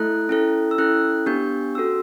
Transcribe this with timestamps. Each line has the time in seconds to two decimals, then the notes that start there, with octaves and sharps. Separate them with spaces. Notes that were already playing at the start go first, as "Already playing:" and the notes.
Already playing: A3 E4 A4 F#6
0.29 C#4 E4 A4
0.71 E6
0.78 C#4 E4 A4 F#6
1.26 B3 D4 G4 G6
1.75 C#4 F#4 A4 E6